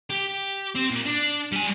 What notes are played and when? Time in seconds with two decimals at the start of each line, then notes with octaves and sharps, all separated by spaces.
0.10 G4
0.75 C4
0.91 A#2
1.06 D4
1.52 G3 G#5